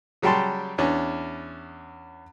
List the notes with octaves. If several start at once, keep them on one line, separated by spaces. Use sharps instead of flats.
C#3 F#3 G3 G5 A5 C6
E2 C#4 D4